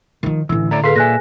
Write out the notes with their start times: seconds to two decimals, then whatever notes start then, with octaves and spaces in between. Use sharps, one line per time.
0.23 D#3 F3
0.49 A1 D3 E3 E6
0.71 A2 E4 D5 A#5
0.84 G#4 A4 B4 F5 C6 B6
0.96 A#2 E5 G#5 F#6 A#6